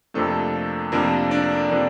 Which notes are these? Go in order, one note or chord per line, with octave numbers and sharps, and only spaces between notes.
F2 C3 F3 A3 A#3 D4 A4
F2 C3 F3 A#3 D4 A#4
D4 D5
C3 F3 A#3 D4